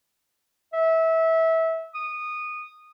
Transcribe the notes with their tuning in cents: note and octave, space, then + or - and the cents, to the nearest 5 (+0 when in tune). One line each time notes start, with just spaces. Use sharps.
E5 -20
D#6 -20